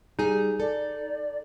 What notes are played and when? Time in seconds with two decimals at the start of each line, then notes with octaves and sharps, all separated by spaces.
0.19 G3 D#4 G#4
0.60 A4 D5